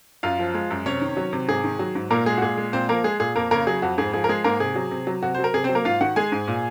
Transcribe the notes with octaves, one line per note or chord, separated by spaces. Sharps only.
F#2 F4 F5
F3
G#3
F#2
C3 C#4 C#5
D#3
F#3
C3
G#2 G#4
D#3
F#3
G#2
A#2 A#3 A#4
G#3 G#4
F#4
A#2 G#4
G#3
A#2 C4 C5
F3 A#3 A#4
G#3 G#4
A#2 G#4
F2 A#3 A#4
C#3 A#3 A#4
F#3 G#4
F2 F#4
G#2 G#4
F3 G#4
A#4
G#3 G#4
G#2 A#3 A#4
C3 G#4
F#3
C3
F#3
C3 F#4
F#3 C5
A#4
C3 G#4
C4 C5
F#3
A#3 A#4
G#2 F4 F5
D#3 F#4 F#5
G#3 G#4 G#5
G#2
A#2